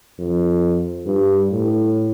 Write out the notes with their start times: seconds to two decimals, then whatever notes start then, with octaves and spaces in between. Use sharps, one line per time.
0.19 F2
1.07 G2
1.51 A2